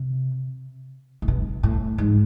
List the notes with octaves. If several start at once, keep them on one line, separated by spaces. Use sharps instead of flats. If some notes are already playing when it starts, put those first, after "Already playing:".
Already playing: C3
A2
B2
A2
G#2